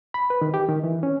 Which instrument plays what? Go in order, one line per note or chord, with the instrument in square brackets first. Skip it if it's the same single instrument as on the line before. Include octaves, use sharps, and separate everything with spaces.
[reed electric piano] B5
B4
D#3
G4
D#3
E3
C#4